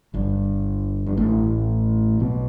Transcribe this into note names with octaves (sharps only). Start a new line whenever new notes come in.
G1 G2
G2
A1 A2
B1 B2